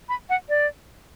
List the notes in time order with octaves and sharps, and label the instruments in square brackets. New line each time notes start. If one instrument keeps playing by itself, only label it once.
[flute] B5
F#5
D5